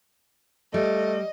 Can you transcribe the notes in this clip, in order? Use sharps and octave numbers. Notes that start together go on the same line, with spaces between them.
G3 A3 D#5